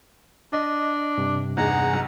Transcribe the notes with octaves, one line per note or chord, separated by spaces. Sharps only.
D4 D#5
G2 C3
E2 D#4 G#4 F#5 A#5
B1